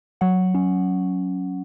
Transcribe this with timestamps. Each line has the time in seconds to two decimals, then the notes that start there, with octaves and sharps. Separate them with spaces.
0.21 F#3 F#5
0.55 C#4